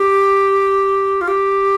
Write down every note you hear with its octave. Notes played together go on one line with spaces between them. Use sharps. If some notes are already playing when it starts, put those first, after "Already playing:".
Already playing: G4
F4
G4